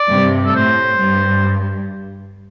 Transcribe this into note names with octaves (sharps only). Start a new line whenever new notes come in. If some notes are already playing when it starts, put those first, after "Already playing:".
Already playing: D5
G2 C3
A4
A2 C5
G2